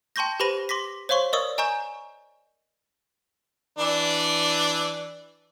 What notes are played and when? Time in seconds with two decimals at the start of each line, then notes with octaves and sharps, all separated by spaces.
0.16 G5 A5 C6 C#6 G6 A#6
0.40 G4 B4 C5 B5 A#6 D#7
0.69 C6 D6 A#6 B6
1.09 C5 C#5 F5 C6 C#6
1.33 A#4 D5 D#5 C#6 D#6 E6
1.58 D#5 G#5 A#5 C#6 G6 E7
3.79 E3 D4